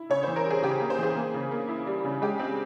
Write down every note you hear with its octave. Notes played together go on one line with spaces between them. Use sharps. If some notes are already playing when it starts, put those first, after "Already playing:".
Already playing: E4
C#3 C#5
E3 C5
A#4
G3
G#4
C#3 G4
A#3
C5
E3 G#4
A#3
C#3
A#3
E4
G3
C#3
G#3 G4
C4